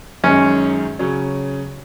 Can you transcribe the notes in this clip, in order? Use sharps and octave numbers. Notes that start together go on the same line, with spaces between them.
F#2 D#3 G#3 C#4 D#4
C#3 F#3 C#4